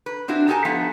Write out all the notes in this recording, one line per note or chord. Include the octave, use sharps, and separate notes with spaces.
B4
C4 D4 E4 F#4
D#4 G4 A4 A#4 G#5 A5
F3 A3 B3 F#5